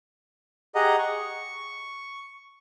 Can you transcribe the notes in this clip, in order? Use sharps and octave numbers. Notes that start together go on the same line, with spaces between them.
G4 G#4 D#5 F#5 A#5
C#6